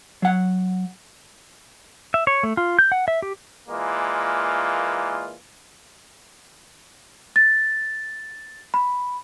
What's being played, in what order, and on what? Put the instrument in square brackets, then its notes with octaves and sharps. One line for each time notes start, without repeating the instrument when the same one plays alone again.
[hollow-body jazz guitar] F#3 F#5
[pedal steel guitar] E5
C#5
A3
F4
G6
F#5
E5
G4
[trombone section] A#2 E3 G#3 A#3 F4
[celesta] A6
B5